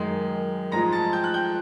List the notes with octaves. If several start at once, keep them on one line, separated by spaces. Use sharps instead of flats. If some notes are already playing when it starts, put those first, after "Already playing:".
Already playing: F#2 D#3 G#3
G#2 F3 G#3 A#5 A#6
A5 A6
G5 G6
F#6
G5 G6